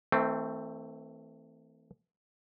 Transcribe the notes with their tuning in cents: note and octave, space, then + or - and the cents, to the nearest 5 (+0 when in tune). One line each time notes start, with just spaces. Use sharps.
E3 -40 A3 +20 C4 +0